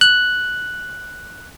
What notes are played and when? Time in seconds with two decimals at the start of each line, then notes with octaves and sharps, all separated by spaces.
0.01 F#6